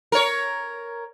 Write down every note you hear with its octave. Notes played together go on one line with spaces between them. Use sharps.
A#4 C#5